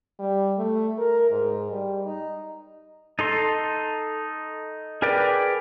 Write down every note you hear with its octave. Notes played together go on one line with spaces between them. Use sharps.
G3
A3
A#4
G#2
G3
D#4
D#4 A4 C6
G#4 A#4 B4 D5 G5